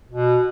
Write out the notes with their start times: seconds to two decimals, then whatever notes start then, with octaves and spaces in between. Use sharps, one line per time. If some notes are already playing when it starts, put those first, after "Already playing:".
0.11 B2